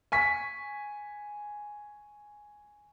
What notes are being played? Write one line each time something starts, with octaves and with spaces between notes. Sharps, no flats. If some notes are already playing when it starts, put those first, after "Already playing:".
G#5 C#6 B6